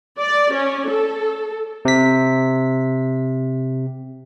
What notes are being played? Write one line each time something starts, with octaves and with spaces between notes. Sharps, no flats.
D5
C#4
A4
C3 B6